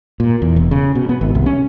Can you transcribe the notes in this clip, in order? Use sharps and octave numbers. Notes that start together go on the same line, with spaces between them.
A#2
E2
E1
C#3
B2
B3
G#1
C2
C#4